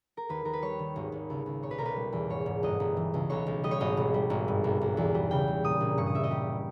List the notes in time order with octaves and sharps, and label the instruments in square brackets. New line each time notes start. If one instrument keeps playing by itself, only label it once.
[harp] A#4
D#2 B4
D#2 A#4
B4
G3 C#5
D#3
G#1
G#1
C#2
C#2
A#2 C#5
B4
B1 A#4
B4
G3
E2
G#2 C#5
G#2
G1 D#5
G1
E3
C#2
B1 C#5
B1
G3 D#5
C#5
G#1 D#5
B1
G3
G#1
G2
B1
B1
E2
G3
C#3 G5
G3
A#2 D#6
A#1
G2 C#6
D#6
G1 E5
D#5
G3 G4